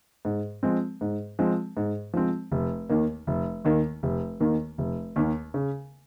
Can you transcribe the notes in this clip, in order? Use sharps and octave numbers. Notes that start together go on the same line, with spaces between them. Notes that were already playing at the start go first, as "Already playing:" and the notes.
G#2
F3 G#3 C4
G#2
F3 G#3 C4
G#2
F3 G#3 C4
F1
D#2 D#3 A#3
F1
D#2 D#3 A#3
F1
D#2 D#3 A#3
F1
D#2 D#3 A#3
C#3